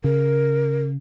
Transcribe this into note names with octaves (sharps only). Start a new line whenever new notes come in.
C#3 A#4